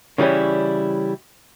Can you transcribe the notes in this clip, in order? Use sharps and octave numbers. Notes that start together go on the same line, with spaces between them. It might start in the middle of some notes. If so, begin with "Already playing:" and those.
C#3 E3 G3 C#4 E4